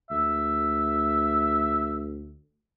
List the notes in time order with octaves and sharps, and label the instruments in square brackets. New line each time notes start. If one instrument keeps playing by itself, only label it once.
[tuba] D2 [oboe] E5